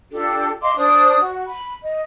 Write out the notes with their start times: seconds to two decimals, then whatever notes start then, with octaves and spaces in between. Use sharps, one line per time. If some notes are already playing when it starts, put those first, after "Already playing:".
0.11 D4 F4 G4 A4
0.62 D#5 F5 C6 D6
0.76 D4 C5 D5 D#6
1.19 F#4
1.48 B5
1.82 D#5